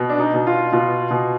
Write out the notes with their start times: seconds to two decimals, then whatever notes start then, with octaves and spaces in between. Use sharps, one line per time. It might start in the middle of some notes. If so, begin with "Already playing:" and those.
Already playing: B2
0.09 D4
0.19 D#4
0.33 B2
0.47 F4
0.72 B2 F4
1.11 B2